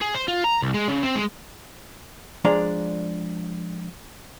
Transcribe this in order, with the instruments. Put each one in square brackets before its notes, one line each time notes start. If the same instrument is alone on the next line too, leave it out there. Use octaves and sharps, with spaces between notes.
[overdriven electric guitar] G#4
C5
F4
A#5
C2
G#3
C#3
C4
G#3
[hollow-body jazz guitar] F3 G#3 D4 D5 A#5